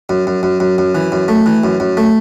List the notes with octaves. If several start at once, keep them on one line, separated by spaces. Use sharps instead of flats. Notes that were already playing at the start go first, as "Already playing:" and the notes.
F#2
F#2
F#2
F#2
F#2
E3
F#2
A3
E3
F#2
F#2
A3